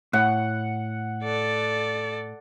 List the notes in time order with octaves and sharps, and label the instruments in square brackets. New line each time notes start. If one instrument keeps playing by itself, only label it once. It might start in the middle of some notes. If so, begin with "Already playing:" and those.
[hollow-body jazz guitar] A2 [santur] F#5
[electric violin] A4 D5